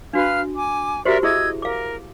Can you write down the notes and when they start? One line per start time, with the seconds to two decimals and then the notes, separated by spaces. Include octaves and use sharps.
0.13 D4 F#4 B4 F5 F6
0.56 G#5 D6
1.05 F#4 G4 A#4 C5 D5 E5
1.23 E4 G#4 D#5 E5 E6 G#6
1.62 A#4 F5 D6